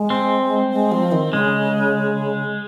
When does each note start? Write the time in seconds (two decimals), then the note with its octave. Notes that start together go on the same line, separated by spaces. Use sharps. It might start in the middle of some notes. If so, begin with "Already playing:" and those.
Already playing: G#3
0.10 C4
0.72 G#3
0.92 F3
1.12 D#3
1.32 C#3 G#3